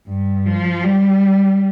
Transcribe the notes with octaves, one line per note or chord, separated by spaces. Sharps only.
G2
F3
G3